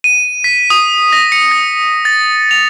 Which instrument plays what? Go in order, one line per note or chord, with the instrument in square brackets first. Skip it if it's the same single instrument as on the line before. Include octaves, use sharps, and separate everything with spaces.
[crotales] D#7
B6
D#6
A#6
C#7
A#6
A6
F7